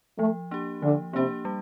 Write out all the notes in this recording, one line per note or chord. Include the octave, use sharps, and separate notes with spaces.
F3 A3
A#3 D4 G4
D3 F3
C3 A#3 D4 G4
G3